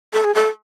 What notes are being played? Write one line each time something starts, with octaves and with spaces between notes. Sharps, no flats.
A4
G#4
A4